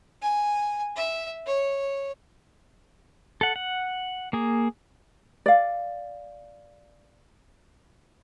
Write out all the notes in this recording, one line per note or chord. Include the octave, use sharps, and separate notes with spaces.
G#5
E5
C#5
A4 F#5
F#5
A#3 G#4
D5 F5